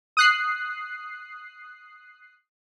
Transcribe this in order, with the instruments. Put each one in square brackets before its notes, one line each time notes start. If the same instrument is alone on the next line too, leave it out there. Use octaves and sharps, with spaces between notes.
[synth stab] D#6 F#6 C7